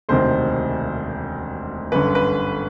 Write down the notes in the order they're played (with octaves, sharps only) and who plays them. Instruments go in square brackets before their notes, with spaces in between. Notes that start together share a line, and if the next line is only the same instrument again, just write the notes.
[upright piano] E1 D2 C3 D#3 C5
G1 F#2 D3 B4
B4